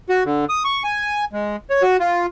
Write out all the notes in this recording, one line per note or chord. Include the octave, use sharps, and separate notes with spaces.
F#4
D3
D#6
C#6
G#5
G#3
C#5
F#4
F4